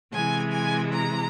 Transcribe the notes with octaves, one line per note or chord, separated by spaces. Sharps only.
C3 E3 G#3 G#5
G#5
A#5